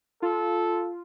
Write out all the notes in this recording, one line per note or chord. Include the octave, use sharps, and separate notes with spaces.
F4 A4